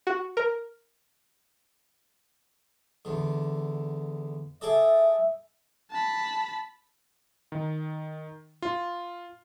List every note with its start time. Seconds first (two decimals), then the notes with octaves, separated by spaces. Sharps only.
0.07 F#4
0.37 A#4
3.05 E2 D3
4.61 G#4 A4 D5 E5
5.91 A5 B5
7.52 D#3
8.62 F4